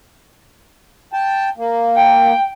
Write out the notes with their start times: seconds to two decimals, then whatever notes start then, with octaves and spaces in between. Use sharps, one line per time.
1.13 G5 A5
1.57 A#3
1.97 G5